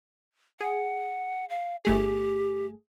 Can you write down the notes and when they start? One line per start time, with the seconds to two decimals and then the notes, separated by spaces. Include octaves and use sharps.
0.61 G#4 F#5
1.50 F5
1.85 G1 A3 G4 G#4